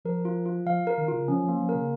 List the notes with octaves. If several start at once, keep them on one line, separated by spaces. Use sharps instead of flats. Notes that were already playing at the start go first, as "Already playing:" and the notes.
F3 A#4
F4
F4
F3 F5
A#4
D#3
C#3 F4
F3 C#4
F3
A#3
F3
A#4
C#3